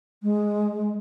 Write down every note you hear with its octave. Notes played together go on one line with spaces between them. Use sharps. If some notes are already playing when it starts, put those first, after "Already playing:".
G#3